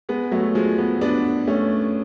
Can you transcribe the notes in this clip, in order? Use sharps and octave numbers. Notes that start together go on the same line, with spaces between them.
G#3 B3
F#3 A3
F3 G#3
G#3 B3
B3 D4
A3 C#4